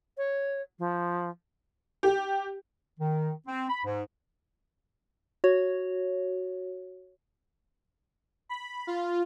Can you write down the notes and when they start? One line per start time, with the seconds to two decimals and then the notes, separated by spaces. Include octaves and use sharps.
0.18 C#5
0.79 F3
2.03 G4
3.00 D#3
3.47 C4
3.69 B5
3.85 G#2
5.44 F#4 C#5
8.49 B5
8.87 F4